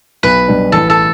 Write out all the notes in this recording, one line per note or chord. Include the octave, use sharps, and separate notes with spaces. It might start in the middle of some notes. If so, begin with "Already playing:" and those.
B1 B4
B2 G3 D4
A1 A4
A4